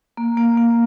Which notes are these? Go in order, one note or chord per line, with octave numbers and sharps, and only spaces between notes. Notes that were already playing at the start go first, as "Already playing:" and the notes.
A#3
A#3
A#3